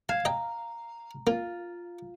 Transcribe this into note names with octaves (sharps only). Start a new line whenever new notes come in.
F5 G#5 G#6 C7 E7
D#5 G5 A#5
A#3 F4